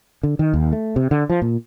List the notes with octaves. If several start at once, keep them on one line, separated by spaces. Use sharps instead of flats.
D3
D#3
D#2
A3
C3
D3
F3
A#2